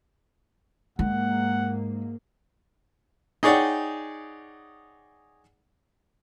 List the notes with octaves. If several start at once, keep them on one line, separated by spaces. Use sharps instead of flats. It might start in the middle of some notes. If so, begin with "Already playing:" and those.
G#2 G#3 A#3 F#5
D#4 G#4 C#5 D5 F#5 G5